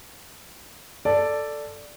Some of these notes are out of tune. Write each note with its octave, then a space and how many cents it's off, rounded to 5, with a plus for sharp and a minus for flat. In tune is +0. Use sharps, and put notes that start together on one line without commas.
A4 +5 D5 +0